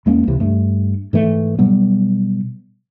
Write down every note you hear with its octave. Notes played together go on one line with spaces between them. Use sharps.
E2 G#3 A#3 C#4
C#2 C3 E3
G2 A3
G#2 E3 A3
B2 F#3 G3 B3